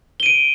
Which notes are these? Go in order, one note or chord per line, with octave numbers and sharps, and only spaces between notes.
D7 D#7 G7